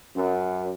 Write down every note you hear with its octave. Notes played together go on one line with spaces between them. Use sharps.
F#2